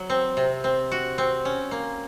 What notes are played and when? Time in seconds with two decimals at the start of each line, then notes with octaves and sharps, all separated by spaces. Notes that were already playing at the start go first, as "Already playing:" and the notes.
Already playing: F#3
0.10 C4
0.37 C3
0.64 C4
0.91 F#4
1.18 C4
1.45 C#4
1.71 A#3